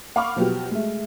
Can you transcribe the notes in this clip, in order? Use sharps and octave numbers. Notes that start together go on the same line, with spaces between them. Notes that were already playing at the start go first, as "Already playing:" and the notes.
F5 F#5 B5 C#6 D6 F6
B2 F3 F#3 B3 F#4 G4
G#3 A3